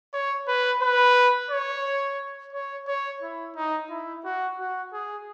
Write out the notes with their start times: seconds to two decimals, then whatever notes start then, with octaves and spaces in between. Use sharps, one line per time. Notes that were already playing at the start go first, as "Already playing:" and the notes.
0.13 C#5
0.47 B4
0.82 B4
1.50 C#5
2.53 C#5
2.87 C#5
3.22 E4
3.56 D#4
3.90 E4
4.24 F#4
4.58 F#4
4.93 G#4